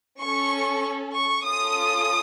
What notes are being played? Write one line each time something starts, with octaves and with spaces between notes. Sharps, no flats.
C#4 A4 C#6
C#6
C#4 F4 A4 D#6